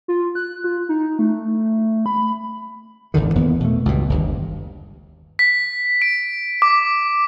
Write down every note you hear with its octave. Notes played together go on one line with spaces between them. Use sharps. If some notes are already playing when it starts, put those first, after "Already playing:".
F4
F#6
F4
D#4
A3
B5
G#1 E2 D3 D#3
E1 E2 A#3 B3
B2 A3
C#2 G2 B2
G1 D#2
B6
D7
D6